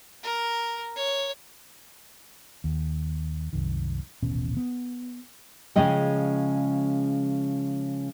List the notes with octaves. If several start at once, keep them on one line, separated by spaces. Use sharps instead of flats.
A#4
C#5
D#2
C2 F#2 D#3
D#1 A1 B2 C#4
B3
C#3 F3 G#3 C#4 D#5 G5